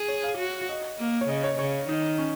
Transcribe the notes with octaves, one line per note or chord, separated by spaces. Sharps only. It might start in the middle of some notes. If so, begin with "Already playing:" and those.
Already playing: G#4
C#5
F5
F#4
D#5
A#3
C#5
C#3 D#5
C#5
C#3 C#5
D#3 D#4
C#4